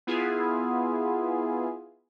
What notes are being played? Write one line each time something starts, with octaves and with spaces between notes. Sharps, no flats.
B3 E4 F4 G#4